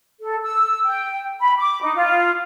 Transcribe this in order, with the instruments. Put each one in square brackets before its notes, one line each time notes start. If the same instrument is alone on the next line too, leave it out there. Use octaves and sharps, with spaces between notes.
[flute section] A4
E6
G5
B5
D6
D#4
F4